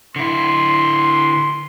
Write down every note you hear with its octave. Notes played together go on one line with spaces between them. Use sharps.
D3 E4 C6